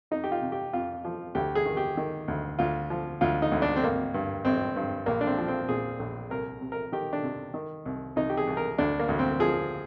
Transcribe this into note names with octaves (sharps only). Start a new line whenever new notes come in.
F2 D#4
G4
F4
C3
G4
F2 F4
F3
D2 G4
G#4
D#3
G4
D#3
D2
D2 F4
F3
D2 F4
D#4
D2
D4
C4
G#1 A#3
G2
G#1 C4
G2
A#1 A#3
D4
C4
F3
C4
A#2 G#4
A#1
C2 A#4
C3
A#4
D#3 G4
D4
C3
D#3
C2
C2 D#4
G4
G#4
C2
A#4
D2 D4
A#3
D2
C4
F3 G#4